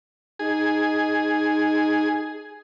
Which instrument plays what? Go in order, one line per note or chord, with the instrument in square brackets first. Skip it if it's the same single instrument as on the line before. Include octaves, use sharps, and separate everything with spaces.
[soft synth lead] D#4 [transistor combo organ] G#4